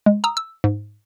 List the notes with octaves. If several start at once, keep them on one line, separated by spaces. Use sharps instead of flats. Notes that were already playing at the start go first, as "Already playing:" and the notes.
G#3
A#5 D#6 E6
E6
G#2